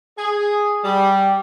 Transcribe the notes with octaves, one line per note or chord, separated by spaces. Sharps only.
G#4
G3